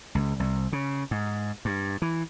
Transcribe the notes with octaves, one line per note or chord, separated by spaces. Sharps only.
C#2
C2
C#3
G#2
G2
E3